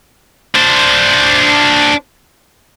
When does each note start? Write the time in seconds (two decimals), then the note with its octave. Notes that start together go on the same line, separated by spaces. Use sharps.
0.56 D4 C5